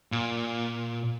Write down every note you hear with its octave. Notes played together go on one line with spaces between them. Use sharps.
A#2